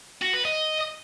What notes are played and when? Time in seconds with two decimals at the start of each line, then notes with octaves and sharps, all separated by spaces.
0.22 F#4
0.34 B4
0.45 D#5